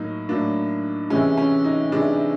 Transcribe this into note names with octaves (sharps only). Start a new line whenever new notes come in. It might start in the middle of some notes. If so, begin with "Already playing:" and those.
Already playing: A2 F#3 A#3 D#4
A2 F#3 A#3 D4
C3 E3 G#3 C#4
C#4
D#4
C3 E3 G#3 D4